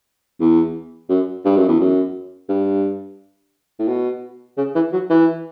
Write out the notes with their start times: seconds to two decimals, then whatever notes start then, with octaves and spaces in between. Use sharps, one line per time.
0.40 E2
1.10 F#2
1.45 G2
1.57 F#2
1.68 E2
1.80 F#2
2.49 G2
3.79 A2
3.88 B2
4.58 C#3
4.75 E3
4.93 F#3
5.10 E3